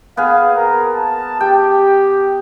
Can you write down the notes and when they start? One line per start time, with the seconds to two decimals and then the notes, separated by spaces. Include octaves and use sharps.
0.17 B3 G#4 F5
0.57 A#4
0.95 A5
1.40 G4 G5